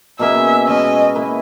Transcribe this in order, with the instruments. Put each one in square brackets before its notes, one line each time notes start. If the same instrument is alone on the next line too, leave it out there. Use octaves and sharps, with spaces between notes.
[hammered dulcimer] B2 A#3 C#4 G#4 [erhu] E5
[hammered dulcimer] B2 G#3 C#4 [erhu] D#5
[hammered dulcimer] A#3 E4 B4 E5